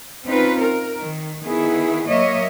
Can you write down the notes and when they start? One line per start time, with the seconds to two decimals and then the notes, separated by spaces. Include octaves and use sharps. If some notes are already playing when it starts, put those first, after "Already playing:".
0.25 C4 C#4 D#4 F4 B4
0.60 A#4
0.99 D#3
1.43 D#3 B3 E4 G#4
2.09 F#3 A#3 C#5 D#5 E5